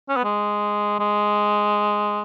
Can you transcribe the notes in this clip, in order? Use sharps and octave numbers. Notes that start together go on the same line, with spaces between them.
C#4
B3
G#3
G#3